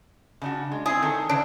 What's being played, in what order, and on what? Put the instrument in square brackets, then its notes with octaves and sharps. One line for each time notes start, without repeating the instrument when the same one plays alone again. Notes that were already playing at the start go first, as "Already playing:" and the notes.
[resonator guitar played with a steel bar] C#3 D4 F#4
G#3
[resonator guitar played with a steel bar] C4 E4 [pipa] G#4
[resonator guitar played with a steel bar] D#3 A4
[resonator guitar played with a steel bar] C#3 [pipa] D4